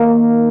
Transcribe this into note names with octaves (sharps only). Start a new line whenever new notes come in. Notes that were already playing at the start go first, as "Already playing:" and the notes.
Already playing: D#3 A#3 D#4